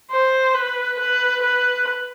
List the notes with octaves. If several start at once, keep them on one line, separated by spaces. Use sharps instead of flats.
C5
B4
B4
B4